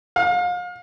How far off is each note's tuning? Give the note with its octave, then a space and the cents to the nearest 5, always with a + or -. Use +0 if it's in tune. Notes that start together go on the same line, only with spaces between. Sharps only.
F5 +35